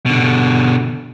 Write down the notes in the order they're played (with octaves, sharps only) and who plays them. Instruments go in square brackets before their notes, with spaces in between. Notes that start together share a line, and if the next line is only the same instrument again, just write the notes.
[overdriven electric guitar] B2 D3